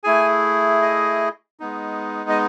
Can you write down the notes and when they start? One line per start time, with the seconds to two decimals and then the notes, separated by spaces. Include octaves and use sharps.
0.04 A3 E4 G#4 G#5
0.82 D#5
1.60 G#3 B3 D#4
2.30 D#5